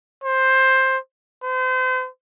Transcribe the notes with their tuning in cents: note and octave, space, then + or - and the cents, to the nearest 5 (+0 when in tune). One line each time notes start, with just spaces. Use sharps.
C5 +10
C5 -35